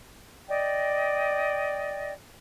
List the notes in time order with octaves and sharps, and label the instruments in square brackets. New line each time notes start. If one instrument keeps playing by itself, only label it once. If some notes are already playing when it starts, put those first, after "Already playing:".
[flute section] D5 D#5 G5